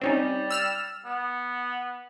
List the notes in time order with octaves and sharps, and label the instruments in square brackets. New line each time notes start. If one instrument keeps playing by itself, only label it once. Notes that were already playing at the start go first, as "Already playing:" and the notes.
[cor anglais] G3 [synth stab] C4 C#4 D#4
[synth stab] E6 F6 E7
[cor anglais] B3